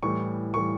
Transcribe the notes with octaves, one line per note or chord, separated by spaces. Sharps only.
A2 E3 G3 C#6
A2 E3 G3 C#6